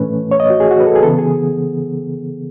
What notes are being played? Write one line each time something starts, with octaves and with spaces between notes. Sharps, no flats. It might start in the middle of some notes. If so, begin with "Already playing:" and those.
Already playing: A2 E3 A3 C#4 B4
C#5
D#5
F#4
G#4
F#4
B4
A4
G#4
C#3 E3 B3 A4
G#4